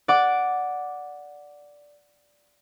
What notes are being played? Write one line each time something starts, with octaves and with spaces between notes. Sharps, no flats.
D5 F#5 D6